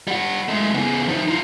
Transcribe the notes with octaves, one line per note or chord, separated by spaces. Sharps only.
G3 F#5
G#3 A3
C#3 B3
F3 D#4
D#4 F4